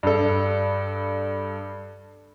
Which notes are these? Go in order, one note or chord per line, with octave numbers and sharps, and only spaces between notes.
G2 A4